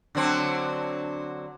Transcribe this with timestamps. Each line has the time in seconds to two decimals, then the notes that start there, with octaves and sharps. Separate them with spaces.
0.15 D3 F#3 C4